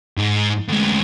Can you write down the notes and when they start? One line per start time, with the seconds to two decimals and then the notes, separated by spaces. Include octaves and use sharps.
0.18 G#2
0.69 D2 G#3